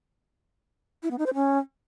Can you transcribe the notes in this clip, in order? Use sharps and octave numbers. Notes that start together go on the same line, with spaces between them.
E4
B3
D#4
C5
C#4